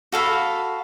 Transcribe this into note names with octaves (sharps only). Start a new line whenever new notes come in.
F#4 A4 F5 B5